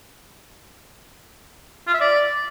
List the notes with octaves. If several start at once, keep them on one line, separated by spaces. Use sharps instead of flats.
F4
E5
D5